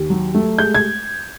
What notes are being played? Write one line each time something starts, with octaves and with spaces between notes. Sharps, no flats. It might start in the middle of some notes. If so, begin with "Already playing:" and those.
Already playing: D#2
F#3
A3
G#3 G6
G#6